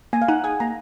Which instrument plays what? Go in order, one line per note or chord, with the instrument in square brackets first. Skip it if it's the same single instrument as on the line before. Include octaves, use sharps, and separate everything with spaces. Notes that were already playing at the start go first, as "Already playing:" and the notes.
[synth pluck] A#3 [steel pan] G#5
[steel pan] F5
[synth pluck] D#4 [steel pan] F#5
[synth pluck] G#4 [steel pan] G#5
[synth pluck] A#3 [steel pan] A#5